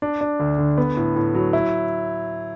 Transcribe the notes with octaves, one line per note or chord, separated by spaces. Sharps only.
D4
D4
D2
D3
B3
A2
A2
F#3
E4